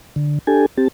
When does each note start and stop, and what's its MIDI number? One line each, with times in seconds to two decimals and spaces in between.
0.16 0.39 50
0.47 0.66 62
0.47 0.66 67
0.47 0.66 69
0.47 0.66 80
0.77 0.88 60
0.77 0.88 67
0.77 0.88 81